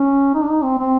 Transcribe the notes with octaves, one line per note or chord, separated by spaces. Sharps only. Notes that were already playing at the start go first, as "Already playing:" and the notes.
Already playing: C#4
D#4
D4
D#4
C4
C4